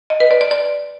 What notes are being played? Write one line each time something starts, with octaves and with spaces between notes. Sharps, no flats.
D#5
B4
D5
D5
D5